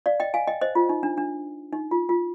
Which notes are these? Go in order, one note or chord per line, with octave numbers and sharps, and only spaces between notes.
D5 F5
D#5 G5
F5 G#5
D#5 G5
C5 D#5
F4
D#4
D4
D4
D#4
F4
F4